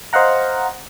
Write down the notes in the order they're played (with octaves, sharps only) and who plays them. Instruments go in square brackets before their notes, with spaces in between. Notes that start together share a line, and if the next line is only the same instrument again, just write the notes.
[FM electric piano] C5 D#5 F5 F#5 A#5